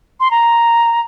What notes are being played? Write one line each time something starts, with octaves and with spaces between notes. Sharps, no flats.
C6
A#5